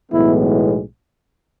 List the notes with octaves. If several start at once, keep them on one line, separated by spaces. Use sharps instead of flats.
B1 A2 E3 G#3 B3 E4